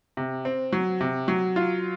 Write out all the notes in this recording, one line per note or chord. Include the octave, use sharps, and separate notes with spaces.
C3
C4
F#3
C3
F#3
F4